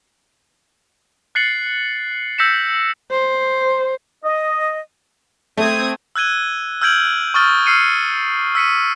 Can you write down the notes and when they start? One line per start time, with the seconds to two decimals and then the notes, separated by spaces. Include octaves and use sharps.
1.35 F#6 A6 C7 C#7 F#7
2.38 E6 G6 A#6 B6 C#7 E7
3.11 C5
4.25 D#5
5.58 A3 C4 D#6 G#6
6.16 E6 F#6 G#6 D#7 G7
6.82 E6 F6 G6 G#6 D7 F#7
7.34 C#6 D#6 F6 A6 G7
7.66 E6 F6 C7 C#7 D#7
8.55 E6 B6 C#7 D#7